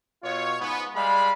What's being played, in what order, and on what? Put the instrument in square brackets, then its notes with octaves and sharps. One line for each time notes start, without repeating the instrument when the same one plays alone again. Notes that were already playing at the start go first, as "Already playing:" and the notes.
[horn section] B2 F4 C#5
G#2 B3
G3 G#3 F5 B5